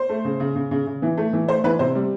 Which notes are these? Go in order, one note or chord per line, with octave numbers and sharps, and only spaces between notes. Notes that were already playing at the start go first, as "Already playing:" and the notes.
Already playing: C5
A3
C#3
C#3
C#3
C#3
C#3
E3
A3
E3
A3 C5
E3 B4
C3 C5
G3